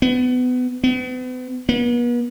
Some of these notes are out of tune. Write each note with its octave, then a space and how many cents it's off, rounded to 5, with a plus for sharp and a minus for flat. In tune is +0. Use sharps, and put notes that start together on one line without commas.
B3 +25
B3 +40
B3 -40